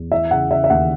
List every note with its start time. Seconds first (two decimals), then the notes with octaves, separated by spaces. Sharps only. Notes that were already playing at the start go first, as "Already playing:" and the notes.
Already playing: E2
0.11 E3 E5
0.31 C#3 F#5
0.50 C#3 E5
0.64 E5
0.70 D#2 F#5